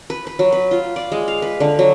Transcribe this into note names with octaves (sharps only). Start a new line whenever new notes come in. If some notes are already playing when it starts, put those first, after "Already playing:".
B4
B4
F#3
B4
F4
D5
G#3
F5
B4
D3
F#3